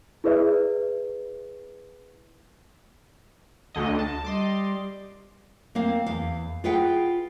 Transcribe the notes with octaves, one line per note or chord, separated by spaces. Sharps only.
E4 G#4 B4 D5 E5
D2 D3 D#5
A5
G3 D#5 C6 D6
A#3 C4 F5
E2 F5
F4 G#4 B4 F#5 G5